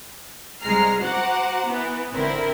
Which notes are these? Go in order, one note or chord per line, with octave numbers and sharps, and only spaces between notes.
C2 G#3 A#5 F6 C7
F#4 C5 F#5 A#5 D6
E3 B3
G#1 D3 C4 E4 A#4